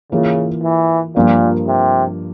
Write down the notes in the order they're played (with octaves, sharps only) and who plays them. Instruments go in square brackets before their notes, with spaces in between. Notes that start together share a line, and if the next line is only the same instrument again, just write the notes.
[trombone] C#3 [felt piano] E3 A#3 F4 A#4
[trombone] E3
[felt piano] G2 F3 A#3 [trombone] A#2
[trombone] C3